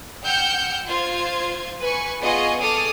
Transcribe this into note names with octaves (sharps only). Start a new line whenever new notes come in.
F#5 G5 E6 F6 G6 C#7
F4 C5 G#6
B4 G#5 C#6
B3 F4 G#4 D#5 G#5 C#6
G#4 A4 D6 D#6 F6